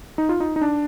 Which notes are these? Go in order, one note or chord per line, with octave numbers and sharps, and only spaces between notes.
D#4
F4
D#4
D#4
D4